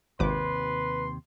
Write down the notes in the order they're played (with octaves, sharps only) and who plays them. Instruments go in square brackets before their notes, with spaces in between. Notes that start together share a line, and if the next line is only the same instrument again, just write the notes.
[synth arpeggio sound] G#1 D6 [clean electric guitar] D#2 C3 [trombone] B4 [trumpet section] C6